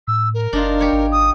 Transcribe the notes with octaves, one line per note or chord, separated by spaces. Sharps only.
A2 E6
A#4
F#1 D4 D#4 F4
G4 C#5
G#1
D#6